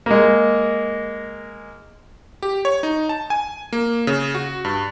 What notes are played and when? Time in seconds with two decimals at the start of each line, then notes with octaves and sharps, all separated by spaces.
0.06 G#3 A#3
2.42 G4
2.65 C#5
2.83 D#4
3.09 A5
3.30 G#5
3.73 A#3
4.07 C#3
4.35 F#4
4.65 G2